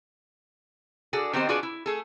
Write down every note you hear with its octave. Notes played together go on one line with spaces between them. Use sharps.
D4 F#4 G#4 A4
D#3 B3 C4 D#4 G4 C5
D4 F4 F#4 G#4 B4 D5
E4
A3 G#4 A4